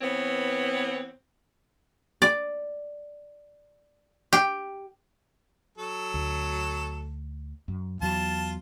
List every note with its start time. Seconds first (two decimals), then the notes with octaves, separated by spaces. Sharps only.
0.01 E3 B3 C4 C#5
2.22 D5
4.33 G4
5.78 F#3 A4
6.14 D2
7.68 F#2
8.02 E2 F#3 F4 A5